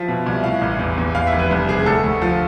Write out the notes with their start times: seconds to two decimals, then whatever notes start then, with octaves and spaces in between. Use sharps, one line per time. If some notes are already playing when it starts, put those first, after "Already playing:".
Already playing: F3 E5
0.08 B2
0.26 C2
0.44 A2 F5
0.61 A1
0.79 E2
0.98 E2
1.15 E2 F5
1.27 E5
1.32 F1
1.39 B4
1.51 C2
1.68 C3 G#4
1.86 D2 A4
2.03 D2
2.22 F3